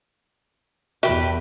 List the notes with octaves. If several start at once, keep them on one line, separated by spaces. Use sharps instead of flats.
E2 B2 F#4 G4 A#4 B4 E5